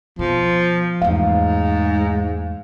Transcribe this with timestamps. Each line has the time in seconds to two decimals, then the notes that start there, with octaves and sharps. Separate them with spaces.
0.19 B2 F3
1.02 E2 G#2 A3 F5